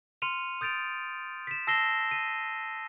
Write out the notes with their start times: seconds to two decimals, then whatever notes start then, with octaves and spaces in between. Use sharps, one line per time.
0.22 C6 F6 C#7 D#7 F7
0.61 D#6 G6 A6 D7 F7
1.47 B6 E7
1.67 A5 E6 A#6 C7 E7 G7
2.11 D#7